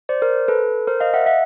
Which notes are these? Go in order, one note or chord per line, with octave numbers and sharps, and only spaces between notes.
C5 D5
A#4 C5
A4 B4
A#4 C5
D#5 F5
E5 F#5
E5 F#5